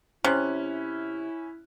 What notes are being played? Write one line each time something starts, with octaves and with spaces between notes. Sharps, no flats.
C3 C#4 E4 F#6